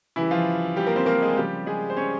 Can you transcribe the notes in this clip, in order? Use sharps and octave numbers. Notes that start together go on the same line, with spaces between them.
C#3 E3 G3 E4
F3 F4
G3 G4
A#3 A#4
C4 C5
A#3 A#4
G#3 G#4
C#3 F3 G3 G4
G#3 G#4
C5
C#4 C#5